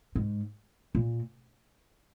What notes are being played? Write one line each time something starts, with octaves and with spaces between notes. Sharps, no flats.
G#2
A#2